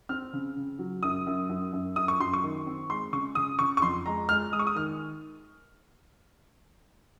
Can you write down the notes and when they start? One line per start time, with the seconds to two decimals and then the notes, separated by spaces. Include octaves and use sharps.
0.09 C4 F6
0.33 C#3
0.56 C#3
0.79 F#3
1.03 F#2 D#6
1.26 F#2
1.49 F#2
1.73 F#2
1.96 F#2 D#6
2.08 C#6
2.20 F#2 C6
2.33 C#6
2.43 D#3
2.66 C4
2.90 G#3 C6
3.12 C#3 C#6
3.35 C#3 D#6
3.59 C#3 C#6
3.77 C#6
3.82 F2 C6
4.06 G#3 A#5
4.29 G#3 F6
4.52 G#3 D#6
4.59 C#6
4.67 D#6
4.75 D#3 F6